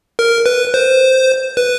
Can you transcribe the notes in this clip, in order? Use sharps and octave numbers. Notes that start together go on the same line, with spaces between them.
A#4
B4
C5
B4